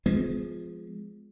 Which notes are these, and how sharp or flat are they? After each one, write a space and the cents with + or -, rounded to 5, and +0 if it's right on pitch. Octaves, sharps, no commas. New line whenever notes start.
F3 +0 G#3 +0 B3 +40